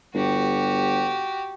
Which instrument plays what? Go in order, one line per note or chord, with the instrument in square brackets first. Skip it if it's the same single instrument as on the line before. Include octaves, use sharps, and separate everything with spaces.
[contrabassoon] G1 [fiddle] F#4 G4